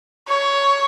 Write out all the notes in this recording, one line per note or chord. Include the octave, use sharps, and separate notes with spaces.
C#5